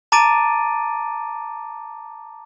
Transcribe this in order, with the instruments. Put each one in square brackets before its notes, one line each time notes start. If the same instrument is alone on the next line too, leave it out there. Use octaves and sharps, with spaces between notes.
[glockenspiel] A5 A#5 D6 A6 D7 D#7